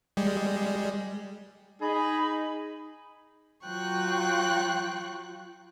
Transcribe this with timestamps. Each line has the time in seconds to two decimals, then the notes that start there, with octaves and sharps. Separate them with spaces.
0.17 G3 G#3
1.81 D#4 G#4 B5
3.66 F#3 F4 G5 C#6 F#6